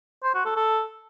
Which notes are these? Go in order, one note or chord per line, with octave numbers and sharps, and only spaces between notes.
C5
F#4
A4
A4